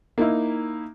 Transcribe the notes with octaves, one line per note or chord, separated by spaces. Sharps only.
A#3 D#4 E4